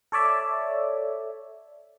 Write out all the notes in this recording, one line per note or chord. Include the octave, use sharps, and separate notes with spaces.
A4 C#5 D5 E5